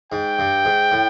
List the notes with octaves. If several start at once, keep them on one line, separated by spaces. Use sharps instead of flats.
G#2 G5
G2
G#2
A2